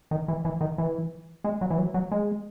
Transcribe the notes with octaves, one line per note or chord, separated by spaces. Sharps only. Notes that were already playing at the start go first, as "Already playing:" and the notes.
D#3
E3
E3
D#3
E3
G#3
F#3
E3
F#3
F#3
G#3